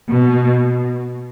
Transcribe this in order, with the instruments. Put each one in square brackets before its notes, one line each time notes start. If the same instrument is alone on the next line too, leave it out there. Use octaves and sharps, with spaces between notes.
[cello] B2